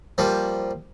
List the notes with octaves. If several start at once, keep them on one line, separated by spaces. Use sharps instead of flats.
F3 G3 A#3